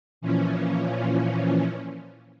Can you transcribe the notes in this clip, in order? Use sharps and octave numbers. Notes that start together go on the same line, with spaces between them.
A#2 E3 F3 C#4